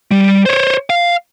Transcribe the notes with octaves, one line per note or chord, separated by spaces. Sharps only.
G3
C5 C#5
F5